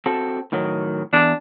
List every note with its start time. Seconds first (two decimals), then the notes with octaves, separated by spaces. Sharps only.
0.06 C4 F#4 A4
0.52 A2 D#3 F#3
1.13 E2 D4